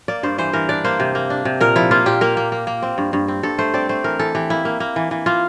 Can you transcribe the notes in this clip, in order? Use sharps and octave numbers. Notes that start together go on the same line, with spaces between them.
A#3 D5
G2 C5
E3 C5
E3 A#4
D4 D5
A#3 C5
C3
A#3
D4
C3
A#2 A#4
F3 E4
A#3 F4
A#2 G4
A#3 A#4
A#3
A#3
A#3
C4
G2
G2
C4
G2 A4
A3 C5
C4 D5
A3 C5
E3 A#4
E3 A4
E3 G4
A#3 E4
A#3
A#3
E3
E3
A#3 F4